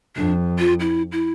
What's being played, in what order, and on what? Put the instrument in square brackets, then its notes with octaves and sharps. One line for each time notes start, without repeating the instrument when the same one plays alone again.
[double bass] F2 [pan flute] D4
[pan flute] F4
E4
E4